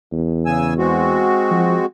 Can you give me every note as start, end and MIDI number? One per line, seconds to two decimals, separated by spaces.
0.13 1.30 40
0.46 0.74 49
0.46 0.74 80
0.46 0.74 88
0.78 1.86 56
0.78 1.86 60
0.78 1.86 66
1.51 1.77 53